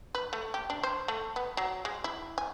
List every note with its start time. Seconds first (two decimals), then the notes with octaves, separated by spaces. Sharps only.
0.15 B4
0.33 A3
0.54 G4
0.70 D4
0.83 C5
1.08 A3
1.36 B3
1.57 F#3
1.85 G#3
2.04 E4
2.38 G#5